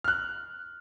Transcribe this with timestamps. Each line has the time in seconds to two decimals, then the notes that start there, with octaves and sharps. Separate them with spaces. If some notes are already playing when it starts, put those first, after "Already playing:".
0.04 F6 F#6